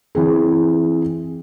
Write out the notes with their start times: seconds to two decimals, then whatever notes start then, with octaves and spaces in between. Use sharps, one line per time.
0.15 E3 C4 G#4